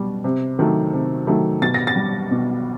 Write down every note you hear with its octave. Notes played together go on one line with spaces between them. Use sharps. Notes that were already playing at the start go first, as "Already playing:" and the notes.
Already playing: B2 G3
C3
D#3 F#3 A3
C3
D#3 F#3 A3
B2 A6
A#6
A6
G3
B2